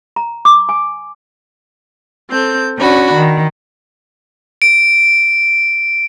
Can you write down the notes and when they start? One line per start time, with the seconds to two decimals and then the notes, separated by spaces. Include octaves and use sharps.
0.16 A#5
0.45 D6
0.69 G#5
2.29 C4 A4 G6
2.78 C#4 D4 F#4 B5
3.14 D#3
4.62 D7